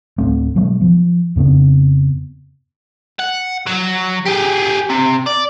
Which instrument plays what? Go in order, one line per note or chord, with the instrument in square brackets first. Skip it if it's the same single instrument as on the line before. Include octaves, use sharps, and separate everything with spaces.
[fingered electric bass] D1 A3 C4
B2 F#3 G#3 B3
F3
F2 C#3 B3 C4
[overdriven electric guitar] F#5
F#3
G4 G#4
C3
D5